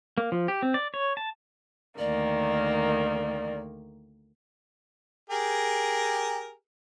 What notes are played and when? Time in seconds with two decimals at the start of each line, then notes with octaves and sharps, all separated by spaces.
0.18 A#3
0.32 F3
0.48 G4
0.62 C4
0.74 D5
0.94 C#5
1.17 A5
1.99 D2 D#3 A#3 D5
5.30 G4 G#4 A#4